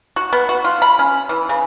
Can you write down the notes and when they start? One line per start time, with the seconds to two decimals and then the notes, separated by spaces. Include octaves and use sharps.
0.16 F#4
0.33 B3
0.49 F#4
0.64 F4
0.82 B5
0.99 C#4
1.29 E3
1.49 C#3